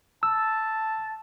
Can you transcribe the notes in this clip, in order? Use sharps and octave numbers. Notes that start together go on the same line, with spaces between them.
A5 E6